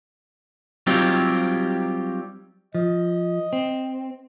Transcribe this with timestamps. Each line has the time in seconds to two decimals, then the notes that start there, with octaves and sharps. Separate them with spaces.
0.87 F#3 G3 C4 D#4 F4 G4
2.75 F3 D#5
3.53 C4